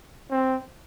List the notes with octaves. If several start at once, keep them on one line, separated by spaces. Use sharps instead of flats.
C4